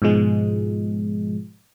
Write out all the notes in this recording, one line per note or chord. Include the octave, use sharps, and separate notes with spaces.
G#2 B2 F3 G#3